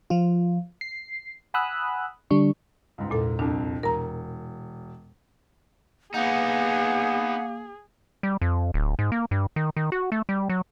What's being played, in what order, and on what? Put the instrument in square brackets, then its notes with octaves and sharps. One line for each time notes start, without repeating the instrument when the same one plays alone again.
[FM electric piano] F3 F4
C7
F#5 G#5 B5 D#6 E6 F#6
D3 G3 D4 C#6
[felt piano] C#2 G#2
[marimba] E2 A#2 A4
[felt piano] C2 F2 [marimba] D4
[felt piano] E1 [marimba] A#4 A#5
[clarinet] A#3 [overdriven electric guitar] B3 D#4 [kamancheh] G#4 [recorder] F#5
[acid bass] G3
F2
D1
G#2
A#3
G2
D#3
D#3
F#4
A3
G3
F#3